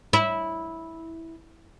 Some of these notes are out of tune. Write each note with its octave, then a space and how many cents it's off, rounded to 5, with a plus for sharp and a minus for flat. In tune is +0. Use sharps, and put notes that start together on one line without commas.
E4 -10